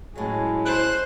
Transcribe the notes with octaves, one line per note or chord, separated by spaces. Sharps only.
A2 F#3 G#3 C#4
C5 F#6